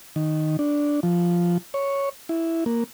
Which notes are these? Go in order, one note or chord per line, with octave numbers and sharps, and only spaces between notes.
D#3
D4
F3
C#5
E4
A#3